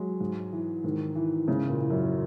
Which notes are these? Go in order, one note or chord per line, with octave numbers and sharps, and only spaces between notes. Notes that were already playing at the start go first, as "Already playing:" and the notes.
Already playing: F#3 G#3
G#2
E3
G#2 D#3
E3
G#2 C#3
A#2
E3
F#2